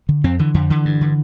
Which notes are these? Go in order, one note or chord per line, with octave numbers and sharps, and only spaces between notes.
D3
F2 C4
D3 E3
F2 D3
D3 E3
G2
D3